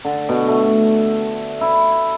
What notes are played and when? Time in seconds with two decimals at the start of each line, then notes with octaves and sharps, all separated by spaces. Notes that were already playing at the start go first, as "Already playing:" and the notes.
0.05 D3
0.29 B2
0.48 A3
1.61 E4